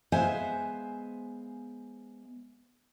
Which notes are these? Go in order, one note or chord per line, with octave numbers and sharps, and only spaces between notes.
G#3 B3 C5 E5 F5 G#5